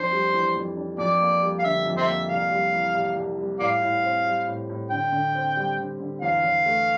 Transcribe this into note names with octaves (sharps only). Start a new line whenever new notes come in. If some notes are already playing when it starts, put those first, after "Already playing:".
Already playing: F2 D4 C5
G3
E3
F2
D4
F2 D5
A#3
G3
F5
D3 E5
F2
C5 E5
A#3
C2 F5
G3
E3
C3
C2
G3
A2 D5 F5
A2
C4
G3
A2
A2
D3 G5
D3
C4
G3
D3
D3
E2 F5
E2
A3